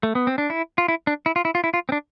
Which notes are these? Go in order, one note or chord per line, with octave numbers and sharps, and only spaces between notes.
A3
B3
C4
D4
E4
F4
E4
D4
E4
F4
E4
F4
E4
F4
C4
D4